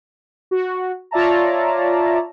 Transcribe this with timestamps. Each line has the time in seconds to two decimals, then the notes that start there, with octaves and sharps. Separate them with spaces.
0.51 F#4
1.11 F4 C#5 D5 E5 A5 A#5